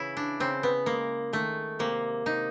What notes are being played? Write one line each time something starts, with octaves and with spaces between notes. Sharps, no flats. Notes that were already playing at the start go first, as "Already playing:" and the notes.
Already playing: C#3 E3 E4
D4
C#3 C4
B3
G#3 A#3
D#3 A3
C3 A#3
C3 D#4